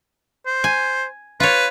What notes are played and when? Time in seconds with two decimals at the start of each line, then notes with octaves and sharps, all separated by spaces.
0.46 C5
0.64 G#5
1.40 F4 B4 C#5